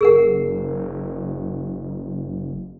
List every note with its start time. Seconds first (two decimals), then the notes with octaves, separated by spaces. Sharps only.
0.01 F#1 G#4 A#4 F#5